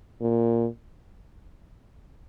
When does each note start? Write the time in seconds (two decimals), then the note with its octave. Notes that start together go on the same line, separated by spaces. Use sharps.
0.21 A#2